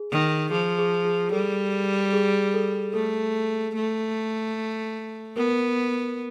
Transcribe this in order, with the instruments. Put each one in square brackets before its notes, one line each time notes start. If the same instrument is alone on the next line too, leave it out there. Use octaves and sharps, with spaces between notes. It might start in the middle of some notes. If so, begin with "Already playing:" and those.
Already playing: [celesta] G#4
[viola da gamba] D#3
[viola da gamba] F3 [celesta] G#4
[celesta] G#4
G#4
[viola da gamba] G3 [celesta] A4
[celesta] G#4
A4
[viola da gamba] A3 [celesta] A4
[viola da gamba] A3
[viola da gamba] B3 [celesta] A#4